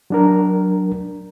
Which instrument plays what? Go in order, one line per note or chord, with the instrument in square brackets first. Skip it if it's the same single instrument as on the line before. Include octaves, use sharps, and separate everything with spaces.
[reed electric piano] F#3 D4 A#4